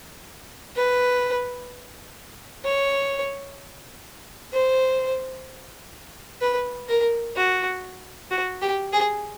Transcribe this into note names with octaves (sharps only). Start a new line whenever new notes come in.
B4
C#5
C5
B4
A#4
F#4
F#4
G4
G#4